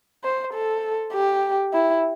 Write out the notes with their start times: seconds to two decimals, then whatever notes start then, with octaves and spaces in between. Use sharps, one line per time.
0.24 C5
0.53 A4
1.13 G4
1.73 E4